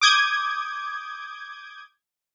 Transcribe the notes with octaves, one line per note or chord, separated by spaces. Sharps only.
D6 D#6 G6 G#6